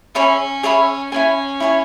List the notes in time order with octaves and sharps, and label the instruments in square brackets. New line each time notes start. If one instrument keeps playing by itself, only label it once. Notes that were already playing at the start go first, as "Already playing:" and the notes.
[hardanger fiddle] C#4 [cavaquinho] G#4 C#5 E5 B5
[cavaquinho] G#4 C#5 E5 B5
[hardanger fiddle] C#4 [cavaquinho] E4 C#5 G#5
[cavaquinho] E4 C#5 G#5